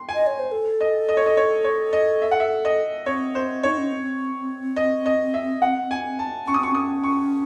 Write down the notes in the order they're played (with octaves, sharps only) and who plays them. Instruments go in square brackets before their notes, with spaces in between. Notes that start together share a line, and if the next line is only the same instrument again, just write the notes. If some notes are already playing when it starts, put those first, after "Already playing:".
Already playing: [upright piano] C6
G#5
[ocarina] D#5
C#5
C5
A4
[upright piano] D#5
D#5
C#5
D#5
C#5
C#5
D#5
E5
F#5
E5
D#5
[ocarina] C4 [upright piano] C#5
[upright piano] C5
[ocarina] D#4 [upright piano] C#5
[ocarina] C#4
C4
[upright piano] D#5
D#5
E5
F#5
G#5
A5
[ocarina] C#4 [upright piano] C#6
[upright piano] D#6
[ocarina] C4 [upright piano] C#6
[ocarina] C#4 [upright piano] D#6
[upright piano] C#6